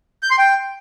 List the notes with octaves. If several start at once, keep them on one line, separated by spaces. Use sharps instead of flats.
G6
C6
G5